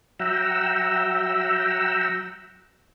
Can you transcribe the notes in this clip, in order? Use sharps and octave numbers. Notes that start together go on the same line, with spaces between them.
F#3 E5 F#5 G5 A#5 E6